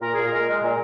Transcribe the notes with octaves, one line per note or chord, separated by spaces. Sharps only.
A#2 A#4
A#2 G#4
A#4
G#3
G#3
A#2